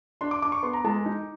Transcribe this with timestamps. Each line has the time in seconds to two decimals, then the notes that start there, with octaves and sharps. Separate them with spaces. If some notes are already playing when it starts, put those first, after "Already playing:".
0.21 D4 C6
0.31 D6
0.42 D4 D6
0.52 C#6
0.63 B3 C6
0.73 A#5
0.84 G#3 A5
1.06 D#4